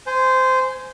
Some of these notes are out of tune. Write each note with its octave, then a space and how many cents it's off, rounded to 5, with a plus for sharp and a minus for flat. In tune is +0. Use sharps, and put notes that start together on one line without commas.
C5 -15 G#5 +0